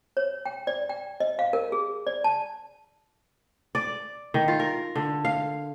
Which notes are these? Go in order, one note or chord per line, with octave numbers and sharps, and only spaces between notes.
C#5
G5
D5
G5
D#5
F5
A#4
G#4
D5
A5
D5
D#3
F4
A#4
D3
F5